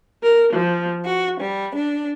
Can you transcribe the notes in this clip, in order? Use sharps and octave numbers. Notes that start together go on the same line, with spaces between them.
A#4
F3
F#4
G3
D4